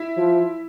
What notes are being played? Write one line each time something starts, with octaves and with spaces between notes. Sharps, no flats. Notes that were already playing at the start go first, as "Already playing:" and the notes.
Already playing: E4
F3